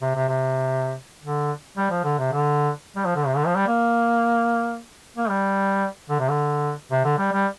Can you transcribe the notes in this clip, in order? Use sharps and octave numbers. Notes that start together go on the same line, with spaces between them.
C3
C3
C3
D3
G3
F3
D3
C3
D3
G3
F3
D3
C3
D3
F3
G3
A#3
A#3
G3
D3
C3
D3
C3
D3
G3
G3